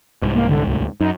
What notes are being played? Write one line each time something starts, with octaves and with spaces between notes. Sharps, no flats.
C2 G#2
A#3
D3
D2
F#2 D#4